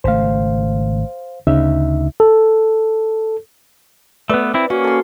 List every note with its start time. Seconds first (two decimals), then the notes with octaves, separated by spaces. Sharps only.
0.04 G#1 C#3 A3 C5 F5
1.47 D2 C#3 D#4 E5
2.20 A4
4.30 A3 B3 B4 D5
4.54 C4 E4
4.70 A#3 C#4 F#4
4.84 A4 C6